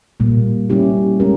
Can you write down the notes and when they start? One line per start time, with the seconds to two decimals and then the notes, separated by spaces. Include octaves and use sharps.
0.20 A#2 G3 A#3
0.70 G3 A#3 C#4 E4 G4
1.20 G#3 C#4 G4 A#4